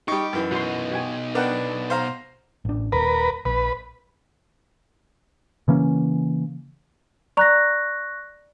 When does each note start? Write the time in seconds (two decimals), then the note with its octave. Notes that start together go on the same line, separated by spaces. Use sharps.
0.08 G3 D#4 G4 D#5 C#6
0.33 F#2 E3
0.52 B2 D#4 F#4 C6
0.92 F#4 G4 G#5
1.35 B3 D4 A#4 F#5 G5
1.90 C5 F5 A#5
2.65 A1 D4
2.92 D#1 A#4 B4
3.45 A#1 B4
5.68 C#3 E3 A#3 C#4
7.37 D5 A#5 C#6 F#6 A#6